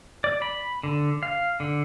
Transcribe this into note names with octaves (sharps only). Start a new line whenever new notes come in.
D5
B5
D3
F5
D3